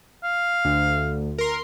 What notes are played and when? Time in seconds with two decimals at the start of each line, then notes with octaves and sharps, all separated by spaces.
0.23 F5
0.65 D2
1.38 A#4 C6